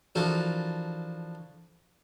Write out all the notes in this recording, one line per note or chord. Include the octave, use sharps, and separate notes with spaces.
E3 F3 D4 F#4 A4 A#4